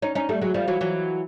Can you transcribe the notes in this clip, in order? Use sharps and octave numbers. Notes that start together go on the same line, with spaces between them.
C#4 D#4
C#4 D#4
G3 A3
F#3 G#3
F3 G3
E3 F#3
E3 F#3